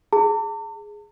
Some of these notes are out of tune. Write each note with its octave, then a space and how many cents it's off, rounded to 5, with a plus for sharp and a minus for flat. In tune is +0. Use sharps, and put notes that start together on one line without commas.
G#4 +0 A5 +45